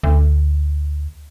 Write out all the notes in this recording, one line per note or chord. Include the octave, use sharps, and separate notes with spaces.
D2